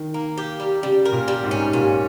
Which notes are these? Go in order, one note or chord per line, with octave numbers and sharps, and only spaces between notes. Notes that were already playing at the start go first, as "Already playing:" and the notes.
Already playing: D#3
A#3
G4
G3
C#3 G3
A#4
A#2
G3
G#2
C#4
A#2 C#4